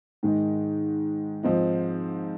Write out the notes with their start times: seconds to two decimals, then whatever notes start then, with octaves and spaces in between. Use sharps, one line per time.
0.23 G#2 D#3 G#3
1.43 G#2 F3 C4 D#4